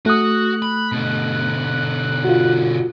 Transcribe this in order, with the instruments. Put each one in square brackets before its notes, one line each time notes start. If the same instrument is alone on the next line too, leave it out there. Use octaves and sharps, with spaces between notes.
[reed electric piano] A3 D#6 [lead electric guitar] F#4 [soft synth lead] F#6
[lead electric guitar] B5
B2 D3
[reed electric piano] F4 F#4